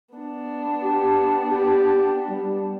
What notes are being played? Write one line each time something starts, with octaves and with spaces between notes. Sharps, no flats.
B3 D4
G4
G4
G3